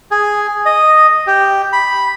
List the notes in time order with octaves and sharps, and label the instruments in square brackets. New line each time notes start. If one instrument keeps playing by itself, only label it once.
[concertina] G#4
D#5
G4
B5